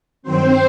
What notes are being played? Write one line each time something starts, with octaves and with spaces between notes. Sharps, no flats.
G2 D#3 F#3 C4 C5